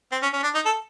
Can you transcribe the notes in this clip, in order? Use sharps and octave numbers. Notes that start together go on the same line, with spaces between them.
C4
C#4
C#4
D4
D#4
A4